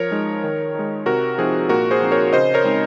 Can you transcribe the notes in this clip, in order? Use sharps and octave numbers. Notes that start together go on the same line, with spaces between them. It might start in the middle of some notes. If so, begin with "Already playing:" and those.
Already playing: F3 A#4 C#5
G#3 D#4
D#3
G#3 D#4
C3 F#4 A#4
F3 C4 D#4 G#4
A#2 F#4 A#4
G#4 C5
F3 C4 D#4
A#4 C#5
C#3 C5 D#5
A#4 C#5
G#3 C4 D#4